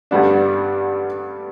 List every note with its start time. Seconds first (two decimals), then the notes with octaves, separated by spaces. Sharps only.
0.11 G2 D3 G3 B3 D4